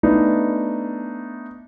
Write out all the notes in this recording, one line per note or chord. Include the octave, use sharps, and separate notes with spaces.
A3 B3 D4 D#4